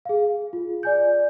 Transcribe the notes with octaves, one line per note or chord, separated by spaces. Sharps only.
G#4 F5
F4
D5 G#5 G6